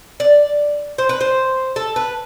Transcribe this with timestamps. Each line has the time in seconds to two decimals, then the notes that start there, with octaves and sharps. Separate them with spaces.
0.20 D5
0.98 C5
1.09 B4
1.21 C5
1.76 A4
1.96 B4